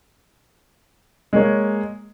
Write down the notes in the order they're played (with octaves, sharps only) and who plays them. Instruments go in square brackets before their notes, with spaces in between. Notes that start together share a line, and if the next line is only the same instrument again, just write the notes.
[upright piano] G#3 A#3 C#5